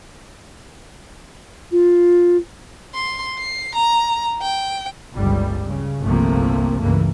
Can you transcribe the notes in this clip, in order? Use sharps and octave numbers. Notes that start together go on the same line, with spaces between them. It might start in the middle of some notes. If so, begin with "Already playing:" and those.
F4
C6
C7
A#5
G5
G1 C#2 G3
C#3
G1 C2 C3 F3 A3 A#3
C#2 G2 E3 A#3